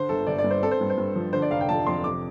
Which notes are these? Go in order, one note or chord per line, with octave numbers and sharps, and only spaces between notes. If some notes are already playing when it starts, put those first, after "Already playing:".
Already playing: D3 C5
G1 A4
G1 D5
D5
G2
C5
C4 A4
C5
G2
C5
G2
F3
D3 C5
D5
F1 F5
G5
F3 A5
F2 C6
C3 D6